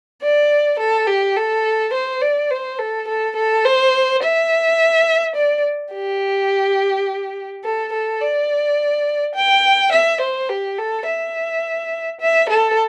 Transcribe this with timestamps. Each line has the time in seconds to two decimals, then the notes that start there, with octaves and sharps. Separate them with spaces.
0.22 D5
0.79 A4
1.07 G4
1.36 A4
1.93 C5
2.22 D5
2.50 C5
2.79 A4
3.08 A4
3.36 A4
3.65 C5
4.22 E5
5.36 D5
5.93 G4
7.64 A4
7.93 A4
8.21 D5
9.35 G5
9.92 E5
10.21 C5
10.49 G4
10.78 A4
11.06 E5
12.20 E5
12.49 A4